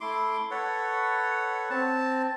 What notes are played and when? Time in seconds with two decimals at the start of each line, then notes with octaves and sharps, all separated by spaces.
0.01 A3 E4 C6 D6
0.51 A4 B4 C#5 F#5
1.70 C4 A5